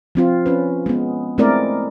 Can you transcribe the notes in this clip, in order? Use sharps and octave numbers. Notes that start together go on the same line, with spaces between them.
F3 C4 F4
C#4 B4
G#3 B3
G#3 A3 C4 E4 A#4 D5